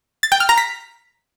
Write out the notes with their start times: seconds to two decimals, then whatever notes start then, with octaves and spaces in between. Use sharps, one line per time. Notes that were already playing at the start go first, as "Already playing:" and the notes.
0.23 A6
0.32 G5
0.40 F6
0.49 A#5
0.58 B6